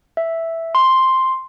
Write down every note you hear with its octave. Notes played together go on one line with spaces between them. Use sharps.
E5
C6